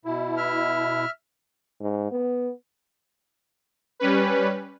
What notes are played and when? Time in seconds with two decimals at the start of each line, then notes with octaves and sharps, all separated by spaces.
0.05 B2 E4
0.37 E5 F6
1.81 G#2
2.12 B3
4.00 G3 C#4 B4